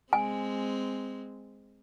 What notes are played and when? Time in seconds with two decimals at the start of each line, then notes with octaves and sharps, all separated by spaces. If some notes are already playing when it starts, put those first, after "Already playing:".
0.13 G#3 C4 G#5